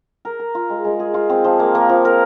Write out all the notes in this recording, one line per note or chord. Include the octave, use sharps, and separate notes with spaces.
A#4
A#4
F4
G#3
G#3
G#4
F4
C4
F3
A#3
A#3
F3
A#4